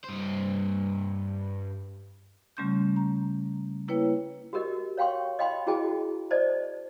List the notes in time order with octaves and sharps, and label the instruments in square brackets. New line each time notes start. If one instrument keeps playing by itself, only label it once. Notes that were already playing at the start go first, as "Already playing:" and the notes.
[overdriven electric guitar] G2 C5
[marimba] C#3 G3 A3 C#4 C6 G6
A#5
A#3 E4 B4 C#5 G5
[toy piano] F#4 G4 A#4 D#5
C#5 F5 G5 C6 C#6
D#5 F5 G5 B5 C6
E4 F#4 G#4 D#5 G5 A5
C5 D5 D#5 A5